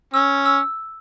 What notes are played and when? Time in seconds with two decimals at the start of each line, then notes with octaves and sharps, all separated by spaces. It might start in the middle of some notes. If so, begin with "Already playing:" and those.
0.14 C#4 E6
0.46 E6